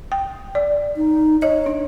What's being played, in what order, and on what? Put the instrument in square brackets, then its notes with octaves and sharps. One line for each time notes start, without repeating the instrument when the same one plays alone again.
[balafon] G5
D5
[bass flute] D#4
[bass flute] C#5 [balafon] D#5
[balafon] D4